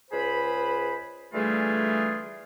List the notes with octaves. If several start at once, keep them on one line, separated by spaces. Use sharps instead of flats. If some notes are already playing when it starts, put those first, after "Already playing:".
C#2 G#4 B4 C5 B5
D3 E3 G3 A3 F4 G#4